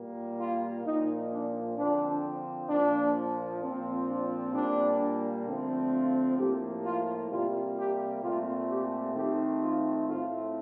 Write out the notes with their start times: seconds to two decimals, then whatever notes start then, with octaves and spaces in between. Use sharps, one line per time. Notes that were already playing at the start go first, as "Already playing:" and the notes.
Already playing: A#2 G3 A#3
0.38 F4
0.84 A#2 F3 A#3 D#4
1.31 D4
1.77 D3 F3 C4 D4
2.69 A#2 F3 A#3 D4
3.62 A#2 F3 C4
4.08 D4
4.53 A#2 G3 A#3 D4
5.46 D3 F3 A3 C4
5.92 F4
6.38 A2 F3 A#3 G4
6.84 F4
7.30 C3 G3 A#3 F4
7.76 G4
8.22 A#2 A3 C4 F4
8.69 G4
9.15 D#3 A3 C4 G4
9.61 F4
10.07 A2 A3 C4 F4